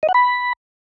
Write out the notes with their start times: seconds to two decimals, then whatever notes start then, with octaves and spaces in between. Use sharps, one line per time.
0.03 D#5
0.09 F#5
0.14 B5